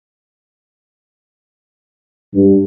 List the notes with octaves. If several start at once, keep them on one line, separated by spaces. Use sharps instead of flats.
G2